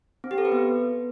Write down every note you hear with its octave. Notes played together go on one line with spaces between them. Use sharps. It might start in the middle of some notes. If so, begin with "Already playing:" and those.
C4
G4
A4
B4
B3